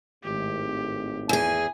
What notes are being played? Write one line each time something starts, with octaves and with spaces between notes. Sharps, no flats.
G#1 A2 G4
E2 G#4 G#5